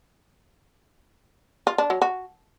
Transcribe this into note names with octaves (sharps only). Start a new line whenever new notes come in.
F4
D4
F#3
F#4